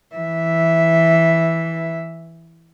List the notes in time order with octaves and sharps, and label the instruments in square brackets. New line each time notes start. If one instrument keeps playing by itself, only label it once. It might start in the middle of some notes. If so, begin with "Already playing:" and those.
[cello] E3 E5